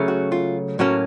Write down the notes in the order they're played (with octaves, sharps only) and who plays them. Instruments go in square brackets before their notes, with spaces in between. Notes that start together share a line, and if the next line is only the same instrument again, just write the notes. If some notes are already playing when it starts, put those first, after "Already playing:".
Already playing: [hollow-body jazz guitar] C#3 F#3 A3 C#4
F#4
F4
A2 F#3 A#3 C#4 F#4